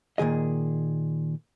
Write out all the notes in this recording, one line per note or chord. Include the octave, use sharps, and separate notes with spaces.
A#2 D#3 G#4 D#5